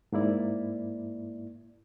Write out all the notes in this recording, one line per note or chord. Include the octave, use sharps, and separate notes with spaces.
G#2 A#3 E4 D5